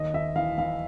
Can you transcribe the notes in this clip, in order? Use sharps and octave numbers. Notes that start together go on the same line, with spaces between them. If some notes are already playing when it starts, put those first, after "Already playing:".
Already playing: D#2 D#5
D#2 E5
E3 F5
E3 F5